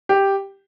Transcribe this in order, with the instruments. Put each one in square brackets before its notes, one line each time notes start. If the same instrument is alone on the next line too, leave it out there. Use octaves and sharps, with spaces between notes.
[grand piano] G4